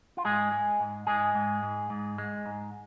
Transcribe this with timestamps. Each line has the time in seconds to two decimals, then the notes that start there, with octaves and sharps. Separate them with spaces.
0.17 F4
0.25 G#2 G#3 G#4
0.52 G#3
0.80 G#2
1.07 G#2 G#3 G#4
1.35 G#2
1.63 G#2
1.90 G#2
2.18 G#3
2.46 G#2